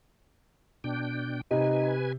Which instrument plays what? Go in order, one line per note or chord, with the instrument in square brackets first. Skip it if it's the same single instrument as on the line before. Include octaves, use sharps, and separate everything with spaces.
[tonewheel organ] B2 D4 G5
[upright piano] C3 [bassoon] D#4 [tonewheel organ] B4 G#5